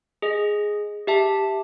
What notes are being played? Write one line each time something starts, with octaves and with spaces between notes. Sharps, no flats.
G#4 D#5
G4 E5 A5